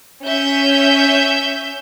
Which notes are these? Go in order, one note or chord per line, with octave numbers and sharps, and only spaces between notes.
C#4 E5 G6